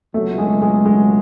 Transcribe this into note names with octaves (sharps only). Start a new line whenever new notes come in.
C#2 B2 F#3 A3
G#3
G#3
G#3